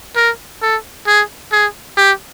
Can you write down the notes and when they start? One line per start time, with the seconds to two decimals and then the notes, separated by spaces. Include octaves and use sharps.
0.16 A#4
0.62 A4
1.07 G#4
1.52 G#4
1.97 G4